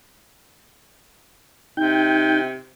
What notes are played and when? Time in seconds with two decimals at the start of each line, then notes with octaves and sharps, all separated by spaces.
1.77 C3 D#4 G5 G6